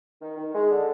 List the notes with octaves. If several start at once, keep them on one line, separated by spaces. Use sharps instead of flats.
D#3
D#3
G#3
D3